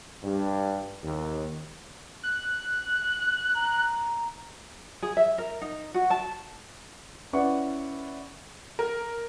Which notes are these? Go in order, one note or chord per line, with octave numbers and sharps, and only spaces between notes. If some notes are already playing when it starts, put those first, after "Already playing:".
G2
D#2
F#6
A#5
G#4
E5
A#4
D#4
F#4
A5
C#4 E4 B4 D5 F#5 C#6
A#4